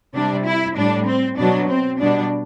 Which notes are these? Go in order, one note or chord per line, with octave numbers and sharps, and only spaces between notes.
C3 G3 D4
E4
A2 G3 D4
C4
B2 F#3 D4
C4
B2 G3 D4